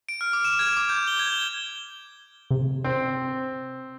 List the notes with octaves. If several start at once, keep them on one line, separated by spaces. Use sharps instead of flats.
D7
F6
D6
E7
G#6
D6
G6
G7
G#6
G7
C3
C4